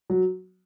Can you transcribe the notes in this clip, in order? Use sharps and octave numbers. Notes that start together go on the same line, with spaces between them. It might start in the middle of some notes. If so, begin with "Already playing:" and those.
F#3